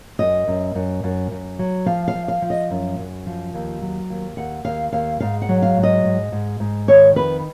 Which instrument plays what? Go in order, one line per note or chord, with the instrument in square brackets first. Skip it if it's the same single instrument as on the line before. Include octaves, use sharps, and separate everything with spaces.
[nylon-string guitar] F#2 D#5
F#2
F#2
F#2
F#2
F#3
F3 F5
F5
F3
F5
F3
D#5
F#2
F#2
F3
D#2
F#3
D#2
D#2 F#5
D#2 F5
D#2 F5
G#2 F5
F#5
F#3
F5
G#2
D#5
G#2
G#2
G#2
D#3 C#5
F2 B4